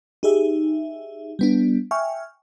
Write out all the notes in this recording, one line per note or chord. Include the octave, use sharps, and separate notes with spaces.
D#4 G4 G#4 E5
G3 B3 D4
E5 G5 G#5 C#6 F6